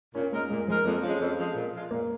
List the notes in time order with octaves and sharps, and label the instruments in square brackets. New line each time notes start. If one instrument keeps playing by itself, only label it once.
[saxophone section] A#2 [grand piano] C#4
[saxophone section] G#3 D#4 A#4 [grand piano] A#3
[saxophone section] A#2 [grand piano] G#3
[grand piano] F3 [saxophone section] G#3 D#4 A#4
[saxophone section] F2 [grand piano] A#3
[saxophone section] F3 G#3 [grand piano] C#4
[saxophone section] F2
F3 G#3
A#2
F3 G#3 F4
[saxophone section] A#2 [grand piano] A#3